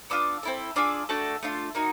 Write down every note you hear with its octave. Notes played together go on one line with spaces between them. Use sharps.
B3 D4 F4 D6 E6
C4 E4 A4
D4 F4 G#4 D6 E6
A3 D4 F#4 A4
A3 D4 F4
A#3 D#4 F#4